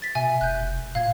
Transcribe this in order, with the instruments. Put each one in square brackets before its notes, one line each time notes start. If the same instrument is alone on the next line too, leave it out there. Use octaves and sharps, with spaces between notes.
[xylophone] A6 B6
[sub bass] B2 [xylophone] E5 G#5
[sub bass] F1 [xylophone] F#6 G6
[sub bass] A#2 [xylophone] F5 G#6